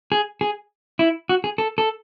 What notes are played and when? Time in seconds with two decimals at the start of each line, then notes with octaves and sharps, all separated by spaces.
0.12 G#4
0.41 G#4
0.99 E4
1.29 F#4
1.44 G#4
1.58 A4
1.78 A4